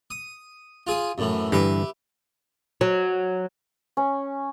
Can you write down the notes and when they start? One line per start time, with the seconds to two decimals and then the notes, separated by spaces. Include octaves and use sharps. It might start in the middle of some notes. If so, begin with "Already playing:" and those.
0.11 D#6
0.87 F4 G#4 D#6
1.18 F#2 A2 E3
1.52 G2 D3 E3 G4 B4 E5
2.81 F#3
3.97 C#4